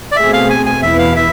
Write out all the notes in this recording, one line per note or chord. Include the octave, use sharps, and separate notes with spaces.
D5
B2 A3 C4 G#4 E5
F5
G#5
G#5
E2 B2 B3 E4 B4 E5
F5
E5